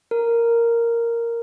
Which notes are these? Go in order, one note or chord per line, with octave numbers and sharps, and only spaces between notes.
A#4